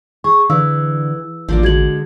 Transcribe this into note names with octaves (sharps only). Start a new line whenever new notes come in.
G#4 C#6
D3 E3 F5 E6
A1 F3 A#3 D4
D3 G#3 F#4 G#6 F#7